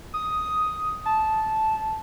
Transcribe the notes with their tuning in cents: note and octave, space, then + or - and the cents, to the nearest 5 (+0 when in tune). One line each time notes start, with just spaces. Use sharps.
D#6 +5
A5 -10